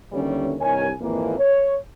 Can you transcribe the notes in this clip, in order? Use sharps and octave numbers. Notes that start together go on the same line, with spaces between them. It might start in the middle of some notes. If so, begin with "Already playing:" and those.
D#2 D3 E3 F#3 G3 C#4
C2 G2 D#3 A#4 C#5 G#5
G#1 F2 E3 A#3
C#5